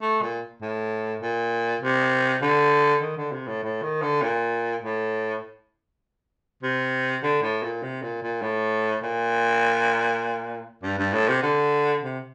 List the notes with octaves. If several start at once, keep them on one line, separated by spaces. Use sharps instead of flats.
A3
A#2
A2
A#2
C3
D3
D#3
D3
C3
A2
A2
D#3
D3
A#2
A2
C3
D3
A2
A#2
C3
A#2
A#2
A2
A#2
G2
G2
A2
C3
D3
C3